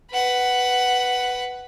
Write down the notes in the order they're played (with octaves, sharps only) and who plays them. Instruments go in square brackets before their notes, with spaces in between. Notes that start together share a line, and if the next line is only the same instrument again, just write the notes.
[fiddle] B4 F#5